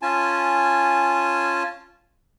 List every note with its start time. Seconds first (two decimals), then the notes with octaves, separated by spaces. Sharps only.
0.02 C#4 F4 G#5 A5